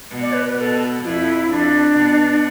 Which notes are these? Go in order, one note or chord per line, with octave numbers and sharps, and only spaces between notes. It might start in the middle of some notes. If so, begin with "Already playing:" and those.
B2
D5
B4
B4
B2 A4 B4
F2 E4 F4
F2 D4
B2